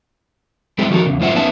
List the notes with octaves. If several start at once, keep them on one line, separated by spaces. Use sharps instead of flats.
G3 G#3 C4 E4 G4 A4
D#3 F3 F#4 G4 A4 A#4
E2 C#3
F#2 A2 F4 C5 E5 F#5
B3 C#4 D#4 E5 A5